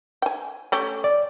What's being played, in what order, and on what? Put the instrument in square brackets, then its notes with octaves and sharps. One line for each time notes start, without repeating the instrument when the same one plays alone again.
[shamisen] G5 G#5
A3 C#4 G4
[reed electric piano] D5